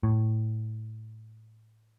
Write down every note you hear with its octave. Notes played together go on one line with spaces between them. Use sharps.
A2